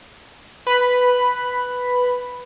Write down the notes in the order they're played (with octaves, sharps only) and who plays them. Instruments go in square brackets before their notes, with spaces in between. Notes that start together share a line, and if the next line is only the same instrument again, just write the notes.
[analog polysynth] B4 B5